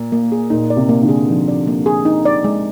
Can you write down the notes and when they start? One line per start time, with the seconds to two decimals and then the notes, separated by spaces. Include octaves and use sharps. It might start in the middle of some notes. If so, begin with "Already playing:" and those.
Already playing: A#2
0.12 A#3
0.32 G#4
0.50 A#2 D#4
0.70 D5
0.76 C3
0.89 A#3
1.03 D3
1.09 G#4
1.28 F3 D#4
1.48 D5
1.67 A#3
1.86 G#4
2.05 D#4
2.25 D5
2.44 G#3